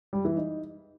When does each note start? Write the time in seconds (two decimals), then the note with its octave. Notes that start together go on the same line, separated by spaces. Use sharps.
0.13 G3
0.25 E3
0.37 D#4